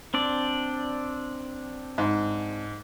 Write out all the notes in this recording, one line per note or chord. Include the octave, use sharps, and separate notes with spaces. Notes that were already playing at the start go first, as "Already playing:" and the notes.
C4 D4 D5
G#2